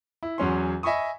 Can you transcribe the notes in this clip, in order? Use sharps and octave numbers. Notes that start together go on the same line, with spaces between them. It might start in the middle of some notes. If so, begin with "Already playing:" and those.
E4
E2 F#3 C#4 C6
D#5 E5 G#5 B5 C#6 D#6